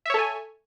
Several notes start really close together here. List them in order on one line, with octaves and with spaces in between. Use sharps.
E5 C#5 A4 G#5